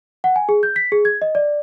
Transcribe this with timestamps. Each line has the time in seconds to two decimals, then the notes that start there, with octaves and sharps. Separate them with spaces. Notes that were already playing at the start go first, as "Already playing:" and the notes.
0.24 F#5
0.36 G#5
0.49 G#4
0.63 G6
0.76 B6
0.92 G#4
1.05 G#6
1.22 D#5
1.35 D5